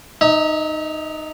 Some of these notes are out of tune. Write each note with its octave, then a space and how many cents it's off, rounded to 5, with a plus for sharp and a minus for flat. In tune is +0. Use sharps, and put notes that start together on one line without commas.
D#4 -10 E5 -40